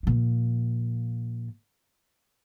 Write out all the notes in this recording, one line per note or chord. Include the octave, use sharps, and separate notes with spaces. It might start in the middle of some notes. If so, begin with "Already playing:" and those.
A#2 F3